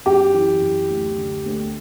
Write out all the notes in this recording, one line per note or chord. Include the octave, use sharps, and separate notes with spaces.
F#2 G4
E3
F#2
D2
D3
D2